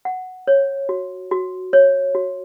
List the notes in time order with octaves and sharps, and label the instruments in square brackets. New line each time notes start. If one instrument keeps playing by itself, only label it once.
[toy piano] F#5
C#5
F#4
F#4
C#5
F#4